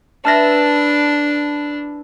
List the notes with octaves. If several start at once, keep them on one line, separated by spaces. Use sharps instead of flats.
D4 E4 B4 A5 F6 A#6